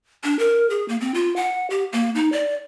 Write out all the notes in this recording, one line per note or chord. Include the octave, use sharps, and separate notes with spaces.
D4
A#4
G#4
A#3
C4
F4
F#5
G4
A#3
D#4
D5